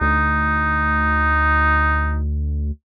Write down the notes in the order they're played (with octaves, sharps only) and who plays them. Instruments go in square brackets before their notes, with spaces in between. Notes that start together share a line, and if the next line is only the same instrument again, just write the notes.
[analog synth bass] D2 [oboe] D#4